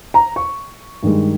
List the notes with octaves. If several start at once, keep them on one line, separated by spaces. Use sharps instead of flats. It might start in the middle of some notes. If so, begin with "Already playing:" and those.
A#5
C#6
G2 D#3 G#3